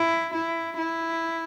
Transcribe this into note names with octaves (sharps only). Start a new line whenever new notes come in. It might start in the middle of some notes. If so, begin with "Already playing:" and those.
Already playing: E4
E4
E4